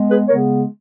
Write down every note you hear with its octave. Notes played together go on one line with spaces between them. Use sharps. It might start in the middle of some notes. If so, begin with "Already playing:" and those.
Already playing: G#3 B3
G#4 B4
C#3 G#3 B3 A#4 C#5